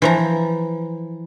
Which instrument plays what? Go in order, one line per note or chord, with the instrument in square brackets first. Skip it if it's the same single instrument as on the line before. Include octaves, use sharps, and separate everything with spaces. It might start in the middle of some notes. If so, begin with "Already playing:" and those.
[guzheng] E3 F3 A#5